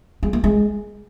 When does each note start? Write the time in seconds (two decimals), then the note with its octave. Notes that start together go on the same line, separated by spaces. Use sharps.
0.23 G#3
0.33 A#3
0.44 G#3